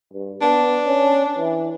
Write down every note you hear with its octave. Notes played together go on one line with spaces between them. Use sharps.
G2
B3 D4
C#4
E3